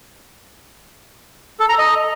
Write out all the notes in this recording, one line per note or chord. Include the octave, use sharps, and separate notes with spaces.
A4
A#5
D#5